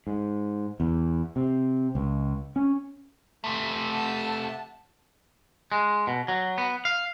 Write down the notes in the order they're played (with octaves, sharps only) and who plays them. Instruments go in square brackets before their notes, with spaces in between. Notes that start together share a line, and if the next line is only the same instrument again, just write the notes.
[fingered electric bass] G#2
E2
C3
C#2
C#4
[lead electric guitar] C3 A3
[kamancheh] F#5 A5
[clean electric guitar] G#3
B2
F#3
B3
F5